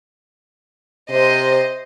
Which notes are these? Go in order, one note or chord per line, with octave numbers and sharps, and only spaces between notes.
C3 C5 D#5